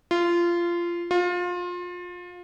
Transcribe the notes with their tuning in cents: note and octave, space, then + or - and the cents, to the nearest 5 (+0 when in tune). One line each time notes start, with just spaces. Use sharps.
F4 -20
F4 +25